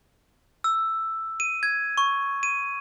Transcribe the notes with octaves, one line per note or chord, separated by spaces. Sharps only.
E6
D#7
G#6
C#6
D#7